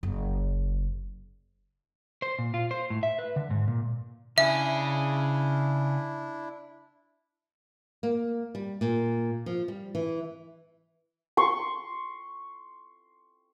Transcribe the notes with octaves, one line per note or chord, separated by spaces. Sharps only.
F#1
C5
A#2
F4
C5
A2
E5
B4
D3
G#2
A#2
C#3 D4 E4 G#4 E5
A#3
G3
A#2
F3
G3
E3
C6 C#6